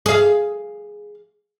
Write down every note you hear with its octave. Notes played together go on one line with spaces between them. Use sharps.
G#4 F5